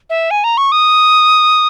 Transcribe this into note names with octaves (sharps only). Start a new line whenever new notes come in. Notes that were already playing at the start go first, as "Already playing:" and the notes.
E5
G#5
A#5
C#6
D#6